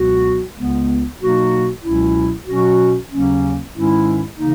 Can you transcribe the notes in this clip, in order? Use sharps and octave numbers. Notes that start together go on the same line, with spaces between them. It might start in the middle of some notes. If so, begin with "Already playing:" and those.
Already playing: C#2 B2 F#3 B3 F#4
C#2 C#3 G#3 B3
B2 F#3 A#3 D#4 F#4
C#2 B2 F#3 C#4 E4
B2 F#3 C#4 F#4
D#2 C#3 F#3 A#3 C#4
G#2 D#3 G#3 C#4 E4
C#3 E3 A#3 D#4